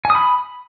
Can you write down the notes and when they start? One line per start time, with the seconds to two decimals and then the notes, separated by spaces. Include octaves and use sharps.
0.05 G#5
0.10 D#6
0.15 B5